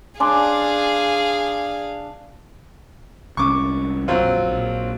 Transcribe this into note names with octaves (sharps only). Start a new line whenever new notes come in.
D4 G#4 F5 G#5 C6 D6
C2 C#4 C#6 D6
A#1 F2 F#3 C4 F4
A#1